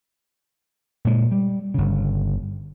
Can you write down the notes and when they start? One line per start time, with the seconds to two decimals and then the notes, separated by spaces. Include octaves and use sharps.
1.05 A#2 G#3
1.32 G3
1.74 G1 C#3